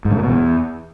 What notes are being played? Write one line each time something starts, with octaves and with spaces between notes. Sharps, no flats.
G#2
D3
A#2
B2
E2